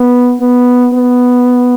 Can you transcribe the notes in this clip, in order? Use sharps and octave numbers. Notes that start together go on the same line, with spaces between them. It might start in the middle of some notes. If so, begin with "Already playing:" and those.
Already playing: B3
B3
B3